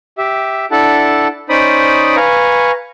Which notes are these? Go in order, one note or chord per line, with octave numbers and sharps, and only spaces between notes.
G4 E5
D4 E4 A4 F#5 A5
C#4 D#4 C5 D5 B5 D#6
B4 F5 G#5 A#5 C#6